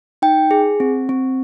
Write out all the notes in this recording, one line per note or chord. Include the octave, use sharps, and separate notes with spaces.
D#4 G5
G#4
C4
C4